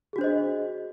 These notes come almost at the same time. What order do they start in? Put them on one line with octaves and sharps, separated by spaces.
G#4 F#4 D4 C5 D#5